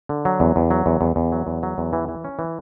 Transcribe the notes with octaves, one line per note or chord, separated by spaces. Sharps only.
D3
F#3
E2
E2
F#3
E2
E2
E2
F#3
E2
F#3
E2
E3
E3
C#4
E3